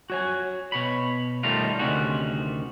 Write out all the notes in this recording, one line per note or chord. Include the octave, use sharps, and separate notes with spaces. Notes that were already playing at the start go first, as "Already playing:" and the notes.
F#4 C#5 G#5
B2 C#5 B5
D#3 G3 A3 D#4 F4
D2 C3 D#3 C#4 F#4